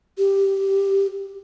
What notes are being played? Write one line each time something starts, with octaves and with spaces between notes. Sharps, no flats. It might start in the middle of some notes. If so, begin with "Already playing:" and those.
G4